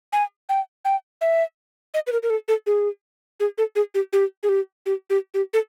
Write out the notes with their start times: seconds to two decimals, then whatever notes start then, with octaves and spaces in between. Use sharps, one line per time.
0.13 G#5
0.49 G5
0.85 G5
1.21 E5
1.94 D#5
2.07 B4
2.12 A#4
2.23 A#4
2.30 A4
2.48 A4
2.66 G#4
3.40 G#4
3.58 A4
3.76 G#4
3.94 G4
4.13 G4
4.43 G#4
4.49 G4
4.86 G4
5.10 G4
5.34 G4
5.53 A4